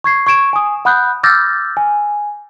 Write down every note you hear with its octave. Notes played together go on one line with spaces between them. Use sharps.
C#6 G#6 C7
C#6 G#6 D7 E7
G#5 D#6
F#5 B5 D#6 F#6 G6
D6 E6 F6 G6 A6 A#6
G#5